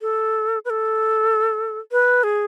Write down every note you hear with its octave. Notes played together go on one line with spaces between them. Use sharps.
A4
B4
A4
B4
G#4